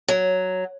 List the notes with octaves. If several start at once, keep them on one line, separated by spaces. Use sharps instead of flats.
F#3